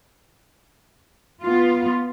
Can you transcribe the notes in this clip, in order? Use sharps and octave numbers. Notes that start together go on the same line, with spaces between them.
B3 F4